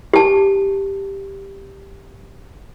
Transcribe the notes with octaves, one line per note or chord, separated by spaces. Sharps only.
G4 A5